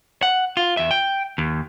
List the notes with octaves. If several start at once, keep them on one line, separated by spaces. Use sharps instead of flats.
F#5
F4
E2 E5
G5
D#2